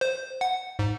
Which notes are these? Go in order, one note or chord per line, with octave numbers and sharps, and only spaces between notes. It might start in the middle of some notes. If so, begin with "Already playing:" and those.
C5
F#5
G#2